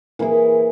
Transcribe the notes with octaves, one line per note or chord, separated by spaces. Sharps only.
E3 A#3 E4 G#4